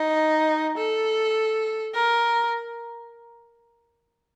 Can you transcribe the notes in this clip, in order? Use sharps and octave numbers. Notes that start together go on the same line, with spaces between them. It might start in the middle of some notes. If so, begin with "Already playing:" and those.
Already playing: D#4
A4
A#4